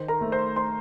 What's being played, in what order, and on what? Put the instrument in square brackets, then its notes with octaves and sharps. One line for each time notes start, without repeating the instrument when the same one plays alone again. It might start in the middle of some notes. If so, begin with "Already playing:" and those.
Already playing: [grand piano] D#3 C5
A#4 A#5
A3
C5 C6
C5 C6